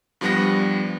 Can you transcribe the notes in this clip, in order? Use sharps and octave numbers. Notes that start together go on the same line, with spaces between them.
G2 F3 G3 B3 F#5 A#6